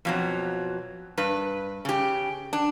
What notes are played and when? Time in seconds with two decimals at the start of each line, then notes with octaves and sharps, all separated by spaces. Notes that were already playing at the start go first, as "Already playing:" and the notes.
0.05 F2 B2 F#3
1.18 G2 B4
1.85 C#3 G4
2.53 D4